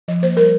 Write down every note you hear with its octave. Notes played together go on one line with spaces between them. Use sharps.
F3 D#5
A#3 C5
G3 A#4